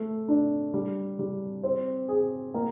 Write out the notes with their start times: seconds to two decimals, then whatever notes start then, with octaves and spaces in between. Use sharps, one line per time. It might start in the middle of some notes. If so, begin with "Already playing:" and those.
Already playing: A3
0.28 D4
0.74 G3
1.19 G3
1.63 C4
2.08 G#4
2.54 A#3